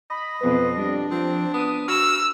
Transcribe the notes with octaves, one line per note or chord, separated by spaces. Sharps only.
D#5 B5
F2 B2 B4
G3 D4
F3 C4
B3 D#6
F#4 E6 F6